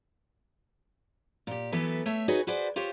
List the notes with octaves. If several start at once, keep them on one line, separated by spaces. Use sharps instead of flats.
A#2 G4
E3 F#3 B3 E4 A4 B4
A3 C#5 E5
D#4 F#4 G#4 B4 C#5
F#4 G#4 B4 C5 D5
F4 G4 C5 C#5